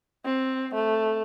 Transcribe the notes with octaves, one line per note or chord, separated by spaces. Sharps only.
C4
A3